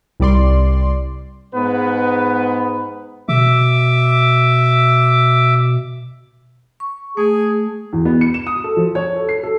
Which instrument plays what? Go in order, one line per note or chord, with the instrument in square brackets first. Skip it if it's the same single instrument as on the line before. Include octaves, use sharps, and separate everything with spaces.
[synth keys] C2 G3 D5 C6
[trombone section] G#2 B3 B4
[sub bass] B2 [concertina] E5 D6
[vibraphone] C#6
[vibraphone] A3 [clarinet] G#4
[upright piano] E2
B3
C#7
E7
D#6
A4
F3
C#5
A4
C7
A4